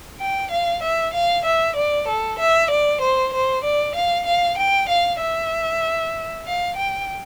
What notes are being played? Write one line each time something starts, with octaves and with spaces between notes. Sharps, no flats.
G5
F5
E5
F5
E5
D5
A4
E5
D5
C5
C5
D5
F5
F5
G5
F5
E5
F5
G5